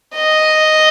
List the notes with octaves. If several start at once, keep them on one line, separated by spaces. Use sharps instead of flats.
D#5